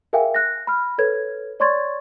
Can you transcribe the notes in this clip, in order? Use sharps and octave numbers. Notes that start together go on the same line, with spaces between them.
G#4 A#4 E5 F5 G5 G#5
F#6 A#6
B5 F6
A4 B4 C#5 G#6
C#5 D5 C6 C#6 G#6 A6